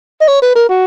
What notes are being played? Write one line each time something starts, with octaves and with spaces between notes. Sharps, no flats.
D#5
C#5
B4
A#4
F#4